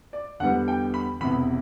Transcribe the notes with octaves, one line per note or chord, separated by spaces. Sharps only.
D5
E2 D3 G3 B3 F#5
G5
B5
E1 E2 C3 B5